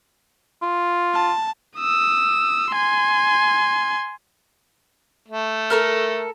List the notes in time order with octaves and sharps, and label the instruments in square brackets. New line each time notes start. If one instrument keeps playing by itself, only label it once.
[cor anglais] F4
[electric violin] A5
D#6 E6
G#5 C6
[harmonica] A3
[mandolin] A4 A#4 F6